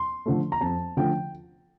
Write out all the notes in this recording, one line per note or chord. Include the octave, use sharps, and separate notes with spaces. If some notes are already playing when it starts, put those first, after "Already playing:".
Already playing: C6
D3 F3 A3
A#5
F2 A5
D3 F3 A3 G5